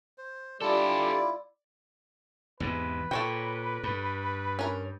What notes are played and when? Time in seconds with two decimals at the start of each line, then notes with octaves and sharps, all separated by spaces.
0.18 C5
0.62 D3 G3 E4 F4 G4 A4 D5
2.60 E2 G#2 C3 B4
3.11 A#2 A4 C#5 G5
3.84 G2
4.59 C#4 A#4